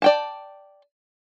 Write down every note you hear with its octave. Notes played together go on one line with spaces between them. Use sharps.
D5 G5 A5